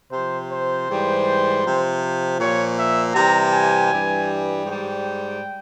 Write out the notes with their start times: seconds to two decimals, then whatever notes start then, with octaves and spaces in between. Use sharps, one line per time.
0.11 C3 F3 C5
0.50 C5
0.88 G#2 E3 G3
1.64 C3 F3
2.39 A#2 F3 C#5
2.77 E5
3.14 C3 E3 G3 A#5
3.53 G#5
3.91 G2 E3 G3
4.66 G#2 G3 G5